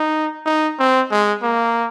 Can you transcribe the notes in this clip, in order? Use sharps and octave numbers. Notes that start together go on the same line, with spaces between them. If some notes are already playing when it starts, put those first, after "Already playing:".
Already playing: D#4
D#4
C4
G#3
A#3